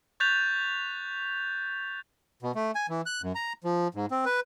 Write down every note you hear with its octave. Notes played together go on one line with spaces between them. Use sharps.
C#6 F#6 G6 A6 B6 F7
B2
A3
G#5
E3
F#6
F#2
A#5
F3
G#2
C4
B4